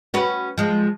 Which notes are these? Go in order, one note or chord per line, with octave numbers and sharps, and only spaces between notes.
C#4 F#4 B4
F3 G#3